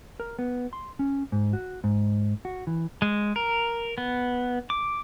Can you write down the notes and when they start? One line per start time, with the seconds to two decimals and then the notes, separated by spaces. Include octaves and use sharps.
0.20 A#4
0.39 B3
0.73 C6
0.99 C#4
1.32 G#2
1.53 F#4
1.84 G#2
2.45 F#4
2.67 E3
3.02 G#3
3.36 A#4
3.98 B3
4.70 D6